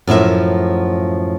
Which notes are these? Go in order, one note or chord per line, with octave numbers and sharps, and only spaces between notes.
F#2 A2 F3 E5